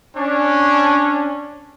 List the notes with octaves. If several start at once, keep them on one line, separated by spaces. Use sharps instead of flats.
C#4 D4